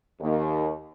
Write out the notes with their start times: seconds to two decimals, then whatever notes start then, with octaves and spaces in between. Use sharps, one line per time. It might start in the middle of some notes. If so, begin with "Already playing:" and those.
0.21 D#2